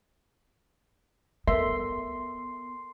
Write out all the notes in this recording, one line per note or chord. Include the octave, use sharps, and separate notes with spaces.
B3 A4 A#4 E5 C6